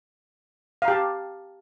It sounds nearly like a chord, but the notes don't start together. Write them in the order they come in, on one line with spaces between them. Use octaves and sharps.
F5 A#5 G4 A5